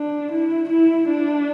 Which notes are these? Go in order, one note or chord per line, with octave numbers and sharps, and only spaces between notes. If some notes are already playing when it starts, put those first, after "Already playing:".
Already playing: D4
E4
E4
D4